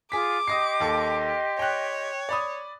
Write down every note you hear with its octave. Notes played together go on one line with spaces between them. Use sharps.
F4 G#4 D6 B6
G4 D#5 C6 D#6 A#6 C7
D#2 A4
C#5 G5 F#6
D5 B5 D#6